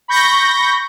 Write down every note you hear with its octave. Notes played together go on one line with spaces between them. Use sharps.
B5 C#6 G6 A#6